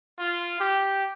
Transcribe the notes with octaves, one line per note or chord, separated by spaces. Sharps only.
F4
G4